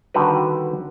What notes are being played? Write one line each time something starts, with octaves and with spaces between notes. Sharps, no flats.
D3 D#3 G3 F#4 G4 B4